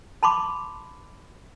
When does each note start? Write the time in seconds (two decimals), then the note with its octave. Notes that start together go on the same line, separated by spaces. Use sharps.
0.23 A5 B5 C6 D6